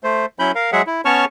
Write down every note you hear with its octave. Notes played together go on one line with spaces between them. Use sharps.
A3 C5
F#3 C#4 E4 B5 G6
A#4 F5
F#3 G#3 G#4 E5 F#5
E4
B3 C#4 C#5 A5 C#6 F6